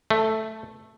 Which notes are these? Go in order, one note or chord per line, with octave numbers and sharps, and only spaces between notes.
A3